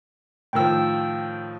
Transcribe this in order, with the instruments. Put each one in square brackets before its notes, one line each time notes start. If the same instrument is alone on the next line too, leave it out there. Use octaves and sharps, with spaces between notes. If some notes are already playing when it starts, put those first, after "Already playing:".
[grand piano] A2 D#3 F3 [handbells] G5 E6